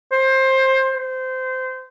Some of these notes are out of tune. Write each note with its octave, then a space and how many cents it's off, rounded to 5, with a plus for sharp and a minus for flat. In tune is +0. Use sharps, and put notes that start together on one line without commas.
C5 +20
C5 -20